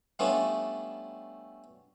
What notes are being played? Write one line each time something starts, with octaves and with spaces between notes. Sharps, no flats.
G3 A3 B3 C#4 D4 F4